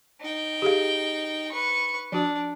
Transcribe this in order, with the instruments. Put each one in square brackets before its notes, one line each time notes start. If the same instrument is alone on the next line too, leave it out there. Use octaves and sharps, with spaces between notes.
[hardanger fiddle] D#4 G5
[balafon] G4 G#4 F5
[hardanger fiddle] B4 C#6
[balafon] F3 F#4 [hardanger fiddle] D4